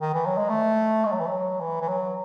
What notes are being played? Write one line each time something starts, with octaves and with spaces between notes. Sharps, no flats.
D#3
E3
F#3
G#3
A3
G#3
F#3
E3
F#3
E3
E3
F#3